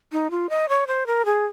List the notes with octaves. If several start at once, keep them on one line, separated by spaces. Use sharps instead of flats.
D#4
F4
D#5
C#5
C5
A#4
G#4